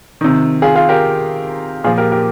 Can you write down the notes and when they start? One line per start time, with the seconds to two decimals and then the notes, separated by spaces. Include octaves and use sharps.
0.21 C3 D#3
0.62 F4 G#4
0.76 F4 G#4
0.89 G4 A#4
1.84 A#2 F3 F4 G#4
1.98 G4 A#4
2.12 G4 A#4